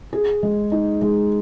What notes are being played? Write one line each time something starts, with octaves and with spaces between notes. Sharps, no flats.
G#4
G#3
D#4
G#3